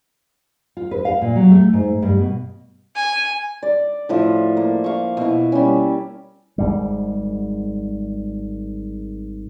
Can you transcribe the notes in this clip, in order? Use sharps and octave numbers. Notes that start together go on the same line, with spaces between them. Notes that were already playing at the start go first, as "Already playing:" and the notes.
F4
B4
F5
A#2
F#3
A3
G#2
G2
B2
G#5
D5
A2 F3 E5
A#3
F5 C#6
B2 E4
G3 A#3 C#4
G#1 G#2 G3